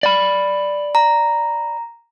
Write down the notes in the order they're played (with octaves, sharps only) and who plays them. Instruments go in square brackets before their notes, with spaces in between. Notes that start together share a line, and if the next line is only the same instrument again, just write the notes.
[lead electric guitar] D5 B5
[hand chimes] A#5